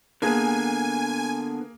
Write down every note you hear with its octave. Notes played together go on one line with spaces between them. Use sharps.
D3 A#3 B3 G#4 G#5 G#6